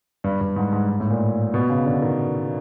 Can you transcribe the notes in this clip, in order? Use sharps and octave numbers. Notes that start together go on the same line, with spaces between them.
G2
G2
G#2
G#2
G#2
A2
A#2
B2
C#3
D3
D#3